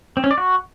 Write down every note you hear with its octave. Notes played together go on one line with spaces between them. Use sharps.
C4
C#4
D5
F#4